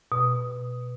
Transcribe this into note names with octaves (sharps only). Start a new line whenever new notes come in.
B2